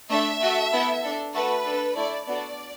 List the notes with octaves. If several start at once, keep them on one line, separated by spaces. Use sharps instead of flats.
A3 D4 A4 E5
A3 F#4 A4
B3 E4 A4
D4 A4
A3 F#4 A4 B4
D4 A4
A3 E4 A4 D5
B3 D4 F#4 A4 D5